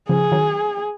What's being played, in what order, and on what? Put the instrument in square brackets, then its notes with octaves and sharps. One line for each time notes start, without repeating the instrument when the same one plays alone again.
[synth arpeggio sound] C#3 F3 [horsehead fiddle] G#4
[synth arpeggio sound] D#3 F#3